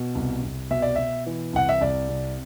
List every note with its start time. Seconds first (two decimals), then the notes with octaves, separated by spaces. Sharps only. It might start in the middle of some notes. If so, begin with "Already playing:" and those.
Already playing: B2
0.15 C2
0.43 C2
0.71 B2 E5
0.82 D5
0.96 B2 E5
1.26 E3
1.53 C2 F#5
1.69 E5
1.81 C2 D5
2.09 C3